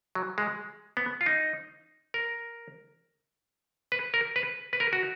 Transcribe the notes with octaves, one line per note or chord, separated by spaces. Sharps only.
F#3
G#3
B3
F4
D#4
A#4
B4
A#4
B4
B4
A#4
F#4